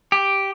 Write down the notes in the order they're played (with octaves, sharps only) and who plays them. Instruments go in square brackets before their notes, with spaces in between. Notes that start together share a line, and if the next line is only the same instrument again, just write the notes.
[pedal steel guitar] G4